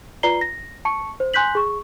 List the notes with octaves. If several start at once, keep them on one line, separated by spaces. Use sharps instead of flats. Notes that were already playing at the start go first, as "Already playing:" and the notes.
F4 B4 D5 A#5 C7 G7
A#6
A5 C#6 C#7
C5
G#5 C6 F#6 G6 B6 F#7
G#4 C#6